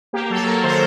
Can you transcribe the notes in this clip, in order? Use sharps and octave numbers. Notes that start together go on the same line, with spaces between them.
A#3 G4
F#3 A4
F#3 A#4
D#3 C5